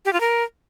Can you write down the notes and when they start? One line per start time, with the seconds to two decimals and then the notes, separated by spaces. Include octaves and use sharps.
0.05 G4
0.13 F4
0.21 A#4